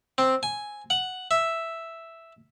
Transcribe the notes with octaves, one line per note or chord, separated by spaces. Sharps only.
C4
G#5
F#5
E5